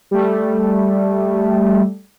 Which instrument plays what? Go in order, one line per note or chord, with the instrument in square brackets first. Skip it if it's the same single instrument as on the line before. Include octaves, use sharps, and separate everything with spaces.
[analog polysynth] G3 A3